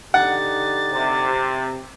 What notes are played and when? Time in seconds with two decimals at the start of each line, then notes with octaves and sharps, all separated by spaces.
0.14 D3 D#4 G4 F#5 A6
0.93 C3